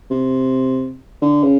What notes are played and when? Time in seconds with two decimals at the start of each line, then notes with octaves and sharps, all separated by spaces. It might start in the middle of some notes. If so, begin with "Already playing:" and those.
0.10 C3
1.22 D3
1.43 C#3